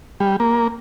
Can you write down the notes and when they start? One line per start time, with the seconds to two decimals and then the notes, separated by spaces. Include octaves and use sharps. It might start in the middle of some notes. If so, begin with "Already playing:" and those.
0.20 G3
0.40 A#3